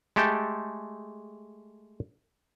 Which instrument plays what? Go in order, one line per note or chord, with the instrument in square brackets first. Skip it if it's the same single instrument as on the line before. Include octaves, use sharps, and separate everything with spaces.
[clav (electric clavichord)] G#3 A3 G4 A4 G5